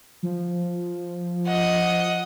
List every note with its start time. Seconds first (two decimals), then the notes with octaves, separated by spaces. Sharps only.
0.23 F3
1.47 D#5 F#5